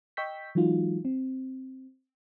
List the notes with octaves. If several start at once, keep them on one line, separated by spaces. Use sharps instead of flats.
D#5 G5 C#6 E6 G6 B6
E3 F#3 G#3 D#4 F4 F#4
C4